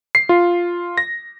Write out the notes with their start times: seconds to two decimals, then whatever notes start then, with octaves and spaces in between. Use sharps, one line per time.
0.15 C7
0.29 F4
0.98 A#6